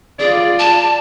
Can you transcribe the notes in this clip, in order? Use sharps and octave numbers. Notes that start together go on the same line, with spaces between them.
F4 G#4 D5
A5